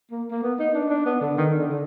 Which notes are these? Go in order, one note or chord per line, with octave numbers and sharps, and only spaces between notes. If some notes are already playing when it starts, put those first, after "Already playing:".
A#3
A#3
B3
D#4
D4
D4
B3
D3
D#3
D3
D3